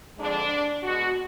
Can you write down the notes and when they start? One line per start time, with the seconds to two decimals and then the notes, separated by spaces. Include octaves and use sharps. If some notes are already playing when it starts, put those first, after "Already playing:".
0.17 F2 D3 G#3 D4
0.82 B2 G#3 F#4